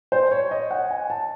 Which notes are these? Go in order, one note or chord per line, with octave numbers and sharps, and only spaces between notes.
C5
C#5
D#5
F#5
G#5
A5